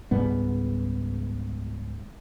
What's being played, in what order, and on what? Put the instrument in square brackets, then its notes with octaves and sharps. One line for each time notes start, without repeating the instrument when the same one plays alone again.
[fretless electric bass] C#2 G#2 G3 B3